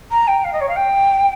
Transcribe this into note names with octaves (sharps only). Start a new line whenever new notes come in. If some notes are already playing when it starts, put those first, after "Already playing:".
A#5
G5
F5
D#5
C#5
F5
G5